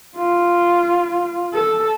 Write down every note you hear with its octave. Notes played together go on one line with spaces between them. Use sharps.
F4
A4